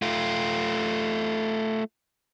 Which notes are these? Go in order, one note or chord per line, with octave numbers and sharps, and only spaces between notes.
A3 F4